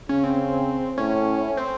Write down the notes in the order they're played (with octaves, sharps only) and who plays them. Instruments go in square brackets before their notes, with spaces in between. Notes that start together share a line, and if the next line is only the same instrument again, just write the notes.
[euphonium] C#3 [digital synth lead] C#4
[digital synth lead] C4
[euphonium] A2 [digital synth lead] C#4
[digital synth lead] C4